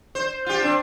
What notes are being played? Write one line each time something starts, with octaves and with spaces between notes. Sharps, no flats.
C5
F4 G4
C4 D4